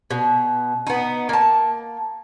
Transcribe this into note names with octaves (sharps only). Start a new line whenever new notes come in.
B2
B3 D#4
A#3 A5